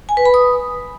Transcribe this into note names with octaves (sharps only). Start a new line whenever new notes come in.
G#5
B4
B5
D#6